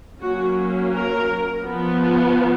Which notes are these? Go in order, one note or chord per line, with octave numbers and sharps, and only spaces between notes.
F#3 A#3 C#4 F#4
A#4
F3 B3